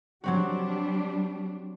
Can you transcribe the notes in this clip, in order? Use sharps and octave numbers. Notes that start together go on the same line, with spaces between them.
F#3 G3 C4 D4 F#4